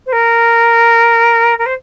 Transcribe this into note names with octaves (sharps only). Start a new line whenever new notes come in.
C5
A#4
A#4
C5